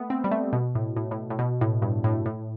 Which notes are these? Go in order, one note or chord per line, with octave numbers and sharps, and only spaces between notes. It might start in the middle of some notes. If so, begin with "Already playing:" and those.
Already playing: A3 B3
C4
G3
A3
B2
A2
A2
A2
A2
B2
A2
G2
A2
A2